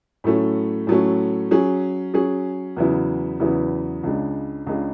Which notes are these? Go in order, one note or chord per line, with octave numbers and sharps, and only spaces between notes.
A2 F#3 A3 C#4
A2 F#3 A3 C#4
F#3 C#4 G#4
F#3 C#4 G#4
E2 C#3 F#3 B3 E4
E2 C#3 F#3 B3 E4
C#2 C#3 G#3 D4
C#2 C#3 G#3 D4